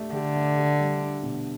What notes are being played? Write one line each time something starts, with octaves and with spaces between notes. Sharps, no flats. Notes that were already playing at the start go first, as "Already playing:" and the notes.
Already playing: A3 G4 D5
D3 G4
A3
G4
G3
D4
B2